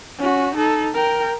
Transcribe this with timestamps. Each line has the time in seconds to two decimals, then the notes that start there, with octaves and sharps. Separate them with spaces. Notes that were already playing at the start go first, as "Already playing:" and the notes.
0.18 C#4 F#4
0.55 D#4 A4
0.94 A#4 G5